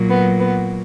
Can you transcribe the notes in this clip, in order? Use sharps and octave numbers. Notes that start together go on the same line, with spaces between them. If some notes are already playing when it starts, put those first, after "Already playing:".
Already playing: A#2 F#3
B3
B3